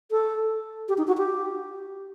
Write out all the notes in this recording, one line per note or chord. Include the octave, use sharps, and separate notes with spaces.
A4
G4
D#4
F#4
G4